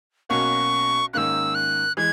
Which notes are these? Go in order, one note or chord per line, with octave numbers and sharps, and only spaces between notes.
B1 B2 A#3 C#4 F#4 C#6
G#2 D#3 A#3 C#4 E6 F#6
F#6
E3 G#3 G#6